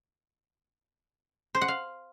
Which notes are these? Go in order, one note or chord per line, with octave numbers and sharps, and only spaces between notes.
C5
F#5
F5